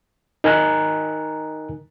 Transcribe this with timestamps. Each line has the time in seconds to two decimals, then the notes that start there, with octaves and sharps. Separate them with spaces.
0.44 D#4 A#4 G#5 A#5 F#6